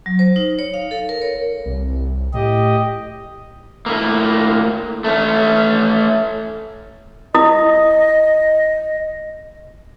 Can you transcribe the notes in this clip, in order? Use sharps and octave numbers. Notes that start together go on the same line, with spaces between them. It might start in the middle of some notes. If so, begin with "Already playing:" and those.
F#3
C5
D#4
C#5
F5
A4
A#4
C#5
C2
A2 G4 D#5
A2 A#3
A3 C#4
E4 D#5 D#6